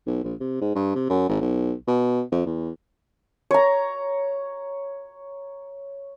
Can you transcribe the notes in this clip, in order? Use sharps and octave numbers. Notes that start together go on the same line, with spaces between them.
B1
A#1
C3
G#2
G2
C3
F#2
G#1
B1
B2
F2
E2
C#5 A#5